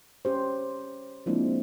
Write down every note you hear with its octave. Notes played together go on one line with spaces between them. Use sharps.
C#4 G4 C5
F3 G#3 A#3 C4 D4 E4